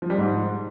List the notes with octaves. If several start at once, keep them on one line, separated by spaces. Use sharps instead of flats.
F3
G3
G#2